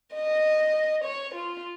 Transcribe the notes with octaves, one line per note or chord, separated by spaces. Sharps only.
D#5
C#5
F4